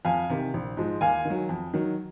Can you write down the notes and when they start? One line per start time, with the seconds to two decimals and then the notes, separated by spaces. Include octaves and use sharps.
0.05 F2 F5 G#5
0.30 C3 D#3
0.54 A#1
0.77 G#2 F3 G#3
1.01 D#2 F5 G#5
1.25 D#3
1.30 F#3
1.49 F2
1.73 D#3 F#3